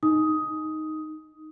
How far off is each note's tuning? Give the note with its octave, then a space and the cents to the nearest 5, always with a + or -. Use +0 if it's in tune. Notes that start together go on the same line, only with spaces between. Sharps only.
D#4 +0 D#6 +10